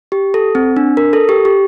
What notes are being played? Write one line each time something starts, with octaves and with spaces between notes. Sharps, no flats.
G4
A4
C4
D4
A#4
A4
G4
G4